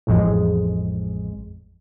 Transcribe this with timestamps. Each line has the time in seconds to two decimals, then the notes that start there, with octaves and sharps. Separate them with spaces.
0.07 A1 F2 G#3